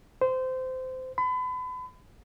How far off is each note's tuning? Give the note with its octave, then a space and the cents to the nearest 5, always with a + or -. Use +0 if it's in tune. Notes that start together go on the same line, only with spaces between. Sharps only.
C5 -20
B5 +35